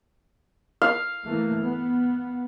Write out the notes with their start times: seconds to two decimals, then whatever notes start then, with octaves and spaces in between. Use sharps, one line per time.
0.82 F5
1.25 E3 A3 A#3
1.61 B3